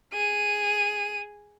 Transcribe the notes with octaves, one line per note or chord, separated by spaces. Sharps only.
G#4 D#7